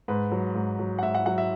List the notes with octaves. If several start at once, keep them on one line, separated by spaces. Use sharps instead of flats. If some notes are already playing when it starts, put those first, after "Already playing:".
G#2 B4
F#3
G#2
F#3
F#5
G#2 E5
F#5
F#3 F#5
E5